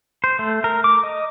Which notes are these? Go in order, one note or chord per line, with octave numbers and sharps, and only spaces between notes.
C5
A3
A#4
D6
D#5